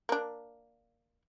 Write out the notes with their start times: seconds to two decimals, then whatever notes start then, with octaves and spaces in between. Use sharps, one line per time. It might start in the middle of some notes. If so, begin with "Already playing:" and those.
0.09 A#3 D4